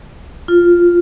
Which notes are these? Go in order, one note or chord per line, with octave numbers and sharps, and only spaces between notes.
F4